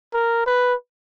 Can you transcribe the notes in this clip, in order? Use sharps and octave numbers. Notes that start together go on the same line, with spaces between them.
A#4
B4